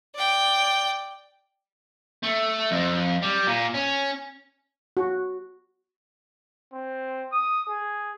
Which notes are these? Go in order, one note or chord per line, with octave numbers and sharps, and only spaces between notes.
D5 G5
A3
F2
G3
A#2
C#4
F#4
C4
D#6
G#4